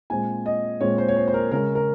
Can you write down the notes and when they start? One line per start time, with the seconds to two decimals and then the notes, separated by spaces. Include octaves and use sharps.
0.10 A#2 G#3 C4 G#5
0.46 D#5
0.81 A#2 G#3 C4 C#5
0.98 C5
1.08 C#5
1.16 C5
1.28 C5
1.34 A#4
1.51 C#3 G#3 C#4 A#4
1.75 A#4